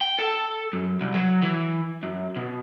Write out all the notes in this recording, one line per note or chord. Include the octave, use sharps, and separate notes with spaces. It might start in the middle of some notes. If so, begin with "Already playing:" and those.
G5
A4
F#2
C2
F#3
E3
F#2
B2